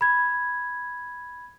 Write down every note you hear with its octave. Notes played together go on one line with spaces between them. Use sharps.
B5 G#6